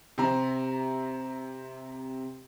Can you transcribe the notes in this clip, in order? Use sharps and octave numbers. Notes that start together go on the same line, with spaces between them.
C3 C4 A#5